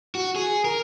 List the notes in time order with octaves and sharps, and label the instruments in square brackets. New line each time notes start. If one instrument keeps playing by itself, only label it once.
[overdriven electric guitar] F#4
G#4
A#4